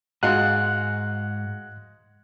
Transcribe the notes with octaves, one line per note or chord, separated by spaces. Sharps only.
G#2 G#3 F#4 F5 F#6